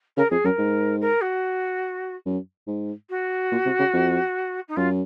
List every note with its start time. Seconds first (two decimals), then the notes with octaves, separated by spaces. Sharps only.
0.17 C#3 A#4
0.30 F2 G#4
0.45 F#2 A#4
0.59 G#2
1.01 A#4
1.21 F#4
2.25 F#2
2.67 G#2
3.10 F#4
3.52 A#2
3.66 C3
3.79 C#3
3.93 F2
4.68 D#4
4.76 F#2 F4